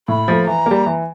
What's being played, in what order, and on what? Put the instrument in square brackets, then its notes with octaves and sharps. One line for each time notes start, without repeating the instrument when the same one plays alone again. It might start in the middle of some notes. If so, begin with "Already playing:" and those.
[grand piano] A2 [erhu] B5
[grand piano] F3 A3
[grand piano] E3 [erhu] A#5
[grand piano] G3 A#3
E3